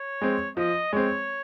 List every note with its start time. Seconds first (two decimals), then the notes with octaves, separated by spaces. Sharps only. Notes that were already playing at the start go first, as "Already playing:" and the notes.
Already playing: C#5
0.21 G#3 C4
0.57 F3 D#5
0.93 G#3 C4 C#5